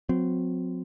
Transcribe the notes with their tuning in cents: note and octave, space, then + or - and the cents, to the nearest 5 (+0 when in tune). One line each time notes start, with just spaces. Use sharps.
F#3 -35 C4 -30